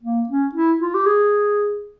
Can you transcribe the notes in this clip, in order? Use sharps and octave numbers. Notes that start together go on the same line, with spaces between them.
A#3
C#4
E4
F4
G4
G#4